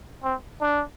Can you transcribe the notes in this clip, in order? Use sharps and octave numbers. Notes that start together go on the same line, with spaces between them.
C4
D4